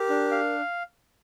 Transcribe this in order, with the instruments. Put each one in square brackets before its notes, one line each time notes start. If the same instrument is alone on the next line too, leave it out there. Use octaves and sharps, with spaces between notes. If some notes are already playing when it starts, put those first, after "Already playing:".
Already playing: [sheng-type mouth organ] G4 [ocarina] A#4
[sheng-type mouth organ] D4
F5